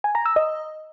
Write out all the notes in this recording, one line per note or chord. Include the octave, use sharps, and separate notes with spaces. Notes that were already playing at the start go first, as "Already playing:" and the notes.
G#5
A#5
E6
D#5